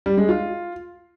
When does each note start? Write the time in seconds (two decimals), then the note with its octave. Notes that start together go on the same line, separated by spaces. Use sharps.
0.06 G3
0.17 G#3
0.29 F4